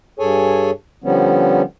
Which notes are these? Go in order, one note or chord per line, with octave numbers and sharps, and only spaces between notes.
G2 G#4 A4 C#5 G#5
D3 F3 G3 B3 C#4